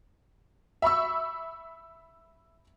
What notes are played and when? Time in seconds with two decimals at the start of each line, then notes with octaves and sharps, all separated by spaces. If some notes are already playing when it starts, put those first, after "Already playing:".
0.82 E5 B5 C#6 E6